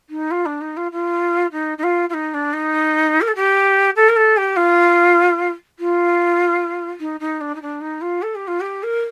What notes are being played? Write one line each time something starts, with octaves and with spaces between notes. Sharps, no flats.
D#4
F4
D4
D#4
F4
F4
D#4
D#4
F4
F4
D#4
D4
D#4
A#4
A4
G4
A4
A#4
A4
G4
F4
F4
D#4
D#4
D4
D#4
D4
D#4
F4
A4
G4
F4
G4
A#4